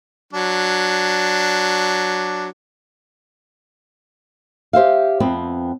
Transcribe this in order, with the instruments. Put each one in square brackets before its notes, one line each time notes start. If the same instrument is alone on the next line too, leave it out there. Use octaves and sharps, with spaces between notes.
[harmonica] F#3 D4
[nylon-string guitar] G4 C5 E5 F5
F2 B3 C4